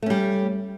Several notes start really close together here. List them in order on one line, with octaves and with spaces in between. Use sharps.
A3 C#4 G3